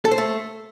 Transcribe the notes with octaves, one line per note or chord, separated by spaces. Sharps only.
A4
C5
A3